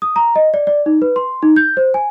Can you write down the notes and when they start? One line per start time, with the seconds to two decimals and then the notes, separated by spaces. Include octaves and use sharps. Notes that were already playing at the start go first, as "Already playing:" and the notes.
0.02 D#6
0.16 A#5
0.36 D#5
0.54 D5
0.67 D5
0.86 D#4
1.02 B4
1.16 C6
1.42 D#4
1.56 G6
1.77 C5
1.94 G#5